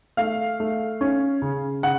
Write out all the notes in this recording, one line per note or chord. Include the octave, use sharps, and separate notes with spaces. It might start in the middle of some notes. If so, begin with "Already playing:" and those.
A3 F5
A3
C#4
C#3
C#3 F#5